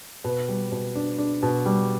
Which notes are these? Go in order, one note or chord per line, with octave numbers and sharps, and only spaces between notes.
B2 B4
G3
B2
D4
D4
B2
G3